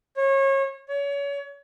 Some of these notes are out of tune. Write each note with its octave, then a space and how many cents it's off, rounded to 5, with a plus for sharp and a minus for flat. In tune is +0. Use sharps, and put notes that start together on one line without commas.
C#5 -30
C#5 +30